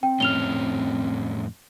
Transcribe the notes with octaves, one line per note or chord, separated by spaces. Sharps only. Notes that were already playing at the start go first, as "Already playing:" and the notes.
C4 G5
F2 A2 C#4 F6 F7 G7